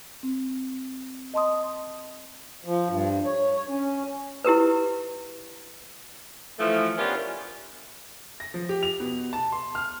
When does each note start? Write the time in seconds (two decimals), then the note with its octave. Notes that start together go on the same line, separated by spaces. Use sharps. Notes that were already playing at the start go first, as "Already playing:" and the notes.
0.23 C4
1.34 D#5 A5 C6 D#6
2.65 F3
2.89 G2
3.25 C#5
3.55 C#5
3.69 C#4
4.44 E4 G4 A#4 B4
6.59 E3 F3 A3
6.97 B3 C#4 D4 F4 G4 A#4
8.40 A#6
8.54 F3
8.69 G4
8.83 F7
9.00 B2
9.33 A5
9.52 C6
9.75 F6